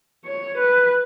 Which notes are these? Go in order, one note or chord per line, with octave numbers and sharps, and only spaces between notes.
C#5
B4